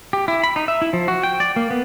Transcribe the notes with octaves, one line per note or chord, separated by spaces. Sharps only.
G4
E4
B5
D#4
E5
E4
F3
F#4
G5
D5
A#3
B3